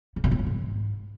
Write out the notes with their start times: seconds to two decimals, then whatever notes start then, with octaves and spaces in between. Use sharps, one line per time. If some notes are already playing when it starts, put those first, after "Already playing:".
0.16 C#3
0.24 B2
0.31 A2
0.39 F#2
0.47 G#2